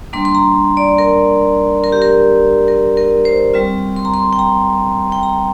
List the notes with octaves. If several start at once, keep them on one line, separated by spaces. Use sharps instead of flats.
G3 A#3 D4 C6
C6
A#5
D5
A#4
A#4
G4
A#4
A#4
A#4
C5
G3 C4 F4
C6
A#5
C6
G5
A#5
G5
A#5